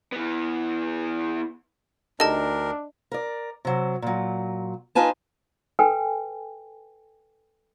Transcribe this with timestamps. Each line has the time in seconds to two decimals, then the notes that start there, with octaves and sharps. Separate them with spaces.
0.12 E3 B3
2.20 D2 D4 D#4 G4 A4 A#4 D#5 A5
3.11 A#4 D5
3.65 C3 F#3
4.02 A#2 F#3
4.95 D#4 F4 B4 G#5 A5
5.79 A4 B4 G5 G#5